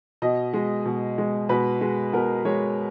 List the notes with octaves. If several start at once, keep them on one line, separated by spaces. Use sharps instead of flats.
B2 D#5
G#3
B2
G#3
B2 B4
G#3
B2 A#4
G#3 C#5